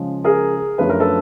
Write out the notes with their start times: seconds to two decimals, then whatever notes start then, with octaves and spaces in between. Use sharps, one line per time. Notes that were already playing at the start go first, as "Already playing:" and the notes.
Already playing: C#3 F3 G#3
0.24 G#4 A#4
0.78 F#2 D3 F3 A3 B4
0.89 A#4
1.00 A4 B4